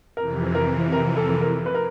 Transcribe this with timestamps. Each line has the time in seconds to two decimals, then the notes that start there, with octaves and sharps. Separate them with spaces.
0.17 F2 C3 E3 A#4
0.55 A#4
0.92 A#4
1.17 A4
1.29 A4
1.41 A#4
1.66 B4
1.74 A#4